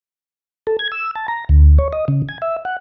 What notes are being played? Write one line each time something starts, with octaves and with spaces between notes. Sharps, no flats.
A4
G#6
E6
A5
A#5
D2
C#5
D#5
C#3
G#5
E5
F#5